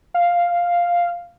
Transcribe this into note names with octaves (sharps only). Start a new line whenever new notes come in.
F5